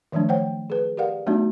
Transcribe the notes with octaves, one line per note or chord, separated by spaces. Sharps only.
D#3 F3 F#3 A3 D4
C5 C#5 F#5 G5
G#4 B4
G4 A#4 D5 F5 F#5
F#3 A3 B3 D4 D#4 F#4